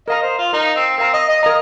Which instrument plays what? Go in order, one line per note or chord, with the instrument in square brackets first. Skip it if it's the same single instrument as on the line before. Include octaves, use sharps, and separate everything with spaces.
[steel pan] A#4 F5 A#5 [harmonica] D#5
[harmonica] C5
F4
[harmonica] D#4 [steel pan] A#4 F5 A#5
[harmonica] C4
[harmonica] C4 [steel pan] A#4 F5 A#5
[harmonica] D#5
D#5
[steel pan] A#4 F5 A#5 [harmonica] D#5